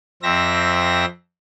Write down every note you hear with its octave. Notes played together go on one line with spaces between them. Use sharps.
F2 C4 E5 A#6